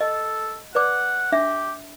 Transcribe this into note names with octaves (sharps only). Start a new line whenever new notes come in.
A4 D#5
B4 D5 F#5 D6
D4 G4 E5